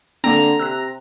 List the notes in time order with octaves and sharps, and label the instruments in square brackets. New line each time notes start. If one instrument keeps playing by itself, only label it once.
[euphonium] D3 [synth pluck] A#3 C4 [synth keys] A#5
[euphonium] C3 [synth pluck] E6 F#6 A#6